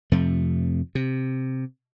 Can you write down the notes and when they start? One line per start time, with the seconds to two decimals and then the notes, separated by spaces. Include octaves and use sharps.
0.12 F2 C3 F3 A3
0.95 C3